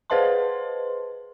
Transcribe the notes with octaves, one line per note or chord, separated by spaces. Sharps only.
G#4 B4 C5 D#5 A5 C6